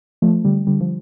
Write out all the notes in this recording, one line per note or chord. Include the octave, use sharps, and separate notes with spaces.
F3 A3
D3 G3
D3 G3
F3